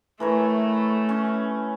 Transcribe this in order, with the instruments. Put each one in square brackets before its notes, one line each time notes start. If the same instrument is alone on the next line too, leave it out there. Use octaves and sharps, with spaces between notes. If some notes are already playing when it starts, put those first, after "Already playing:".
[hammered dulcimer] E3 A#4 C#5 [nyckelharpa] A3
[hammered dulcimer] C#4